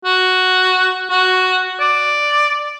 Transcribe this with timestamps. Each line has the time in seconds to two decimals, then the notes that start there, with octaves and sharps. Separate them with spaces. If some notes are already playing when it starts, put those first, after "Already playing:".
0.05 F#4
1.10 F#4
1.80 D5